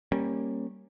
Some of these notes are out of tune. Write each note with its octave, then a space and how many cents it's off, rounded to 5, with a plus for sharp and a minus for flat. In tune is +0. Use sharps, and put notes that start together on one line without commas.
G3 +0 A#3 +0 C#4 -20